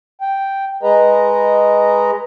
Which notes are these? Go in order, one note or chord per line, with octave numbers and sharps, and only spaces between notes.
G5
G#3 G#4 B4 D#5 A#5